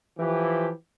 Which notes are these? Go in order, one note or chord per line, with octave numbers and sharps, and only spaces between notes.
E3 F3 G4